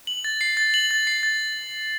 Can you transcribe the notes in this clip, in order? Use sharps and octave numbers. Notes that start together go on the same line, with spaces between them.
F#7
A6
C7
A6
F#7
A6
C7
A6